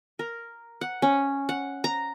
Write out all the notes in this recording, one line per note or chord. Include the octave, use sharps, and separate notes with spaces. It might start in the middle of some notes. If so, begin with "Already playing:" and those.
A#4
F#5
C#4
F#5
A#5